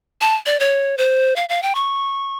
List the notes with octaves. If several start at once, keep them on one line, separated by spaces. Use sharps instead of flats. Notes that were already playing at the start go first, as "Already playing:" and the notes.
A5
D5
C#5
C5
F5
F5
G5
C#6